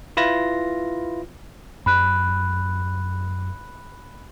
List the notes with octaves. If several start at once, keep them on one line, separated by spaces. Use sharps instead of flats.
E4 F4 B4 A#6
F#2 B5 F#6